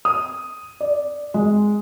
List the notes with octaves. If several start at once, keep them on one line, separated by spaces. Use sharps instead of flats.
D#6
D5
G#3